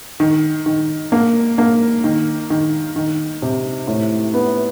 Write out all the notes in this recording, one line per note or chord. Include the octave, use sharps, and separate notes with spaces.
D#3
D#3
A#3
A#3
D#3
D#3
D#3
C3
A2
B3